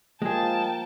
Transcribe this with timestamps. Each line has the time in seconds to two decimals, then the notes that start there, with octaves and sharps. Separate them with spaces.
0.22 F3 G#3 A#3 G#4 G5 A5